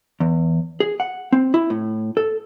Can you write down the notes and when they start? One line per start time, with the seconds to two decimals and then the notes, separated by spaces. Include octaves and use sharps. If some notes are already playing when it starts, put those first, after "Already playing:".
0.20 E2
0.80 G#4
1.00 F#5
1.32 C4
1.54 E4
1.70 A2
2.17 A4